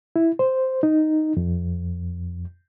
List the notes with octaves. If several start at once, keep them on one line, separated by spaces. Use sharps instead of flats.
E4
C5
D#4
F2